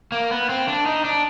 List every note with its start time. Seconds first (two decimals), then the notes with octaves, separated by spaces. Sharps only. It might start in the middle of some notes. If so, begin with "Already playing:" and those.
0.12 A#3
0.31 B3
0.49 C4
0.68 D4
0.86 D#4
1.05 D4